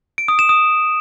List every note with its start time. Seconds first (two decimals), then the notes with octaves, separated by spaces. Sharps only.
0.18 D7
0.28 D#6
0.39 E7
0.49 D#6